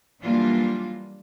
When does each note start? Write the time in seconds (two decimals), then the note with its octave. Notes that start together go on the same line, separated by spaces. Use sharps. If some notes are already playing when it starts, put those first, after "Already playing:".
0.21 E3 F#3 G3 A#3 D4 F4